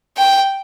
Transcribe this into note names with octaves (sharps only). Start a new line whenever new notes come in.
G5